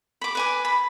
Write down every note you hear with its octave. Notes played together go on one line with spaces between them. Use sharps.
B5 D6
B4 G#5 D6
B5